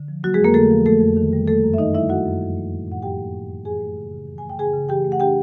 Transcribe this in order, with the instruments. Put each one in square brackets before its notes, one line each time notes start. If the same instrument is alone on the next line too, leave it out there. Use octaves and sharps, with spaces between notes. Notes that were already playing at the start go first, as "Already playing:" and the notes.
Already playing: [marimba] D3
F3
F#3 A#3 F#4
G#3 G#4
F2 A#3 A#4
D3 A3 A4
F3
A3 A#3 A4
F2
D#3
G3
A3 A#3 A4
F#2
E5
D#3 D#4 D#5
G3 E4 E5
A#3 F#4 F#5
F#2
F3
A#3
A2
A2 F#5
F3 G4 G5
A#3
A2
A2
E3 G#4 G#5
A3
C#3
C#3
E3
A3 G#5
G5
C#3 G#4 G#5
C#3
E3 G4 G5
A3
F#5
D4 G4 G5